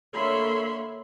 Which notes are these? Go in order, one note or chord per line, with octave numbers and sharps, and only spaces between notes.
D3 A#3 C#5 E5 B5 C6